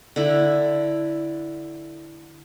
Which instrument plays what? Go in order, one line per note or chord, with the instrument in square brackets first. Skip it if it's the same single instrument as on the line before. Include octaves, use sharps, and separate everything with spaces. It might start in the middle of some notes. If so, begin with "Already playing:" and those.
[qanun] D3 E4